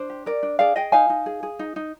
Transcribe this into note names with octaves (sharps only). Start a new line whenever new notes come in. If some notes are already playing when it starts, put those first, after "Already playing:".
Already playing: D4 C5
G4
A#4 D5
D4
G#4 D5 F5
G#4 D#5 G5
D#4 F5 G#5
D#4
G#4
G#4
D#4
D#4